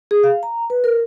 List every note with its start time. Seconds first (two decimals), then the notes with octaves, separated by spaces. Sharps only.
0.11 G#4
0.23 F5
0.43 A#5
0.70 B4
0.84 A#4